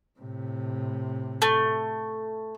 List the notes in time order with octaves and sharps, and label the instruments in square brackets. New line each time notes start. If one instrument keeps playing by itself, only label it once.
[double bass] A2 C3
[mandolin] A3